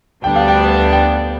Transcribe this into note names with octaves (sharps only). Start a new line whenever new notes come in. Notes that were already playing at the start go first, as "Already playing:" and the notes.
D2 D3 G3 B3 D4 G5
F5
G5
G5